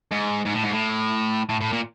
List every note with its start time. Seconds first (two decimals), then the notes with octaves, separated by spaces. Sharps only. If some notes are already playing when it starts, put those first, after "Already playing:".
0.11 G#2
0.45 G#2
0.54 A2
0.63 G#2
0.71 A2
1.49 A2
1.61 A2
1.72 A#2